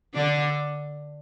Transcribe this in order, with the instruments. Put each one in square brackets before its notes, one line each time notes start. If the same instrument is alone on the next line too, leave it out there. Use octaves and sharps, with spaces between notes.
[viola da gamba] D3 D4